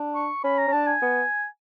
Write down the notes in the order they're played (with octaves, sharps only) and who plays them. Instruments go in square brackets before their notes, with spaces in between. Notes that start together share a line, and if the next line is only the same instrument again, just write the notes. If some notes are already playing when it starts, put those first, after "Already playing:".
Already playing: [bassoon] D4
[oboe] C#6
[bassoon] C#4 [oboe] B5
[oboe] A#5
[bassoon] C#4
[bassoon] D4 [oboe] A5
[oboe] G#5
[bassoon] B3